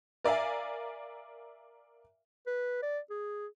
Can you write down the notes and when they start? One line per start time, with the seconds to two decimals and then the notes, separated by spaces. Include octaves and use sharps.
0.24 A#4 D5 E5 F5 G#5
2.46 B4
2.82 D5
3.10 G#4